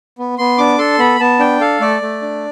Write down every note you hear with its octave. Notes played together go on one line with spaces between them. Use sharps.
B3
B3 C6
D4 D6
A4 C6
B3 B5
B3 A5
D4 G5
A4 F5
A3 D5
A3
D4